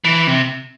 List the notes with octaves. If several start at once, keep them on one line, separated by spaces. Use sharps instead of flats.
E3
C3